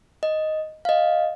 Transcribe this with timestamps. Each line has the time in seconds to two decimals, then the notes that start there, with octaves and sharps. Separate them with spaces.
0.23 D#5
0.85 F5
0.89 D#5